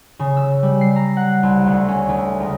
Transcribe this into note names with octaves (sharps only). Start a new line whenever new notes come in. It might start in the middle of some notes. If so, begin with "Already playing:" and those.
C#3
E6
G3
C7
A#5
F#5
C2
D2
C#4
D2
C#2